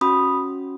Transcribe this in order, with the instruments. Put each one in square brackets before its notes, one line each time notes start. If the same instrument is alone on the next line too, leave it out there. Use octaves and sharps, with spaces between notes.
[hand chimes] C#4 F#4 B5 D#6